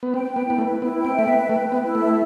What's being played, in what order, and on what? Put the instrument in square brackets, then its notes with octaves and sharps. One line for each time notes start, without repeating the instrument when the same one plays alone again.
[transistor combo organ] B3
[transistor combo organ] C4 [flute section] G5
[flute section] G5
[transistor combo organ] B3
[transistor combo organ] B3 [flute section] E4
[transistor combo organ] A3
[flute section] B4
[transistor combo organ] B3 [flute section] E4
[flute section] G5
[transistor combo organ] C4
[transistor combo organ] A3 [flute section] E5
[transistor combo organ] B3
[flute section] B4
[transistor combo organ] A3 [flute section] G5
[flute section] B4
[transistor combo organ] B3
[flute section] E4
[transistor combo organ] A3 [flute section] E5